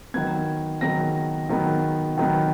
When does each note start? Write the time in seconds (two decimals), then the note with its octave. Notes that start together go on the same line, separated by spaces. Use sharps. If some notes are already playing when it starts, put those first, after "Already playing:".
0.14 D#3 F#3 B3 G#6
0.81 D#3 F#3 B3 A#6
1.49 D#3 F#3 B3
2.17 D#3 F#3 B3